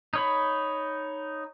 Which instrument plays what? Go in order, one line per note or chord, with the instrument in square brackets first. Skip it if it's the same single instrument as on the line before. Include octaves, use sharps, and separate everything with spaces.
[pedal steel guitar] D#4 C#5 B5